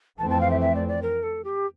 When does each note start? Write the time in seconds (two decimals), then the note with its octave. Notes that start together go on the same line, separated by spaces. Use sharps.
0.18 F2 E3 A3 C4 A5
0.30 A5
0.41 F5
0.51 E5
0.61 E5
0.75 D5
0.88 D5
1.02 A#4
1.23 A4
1.44 G4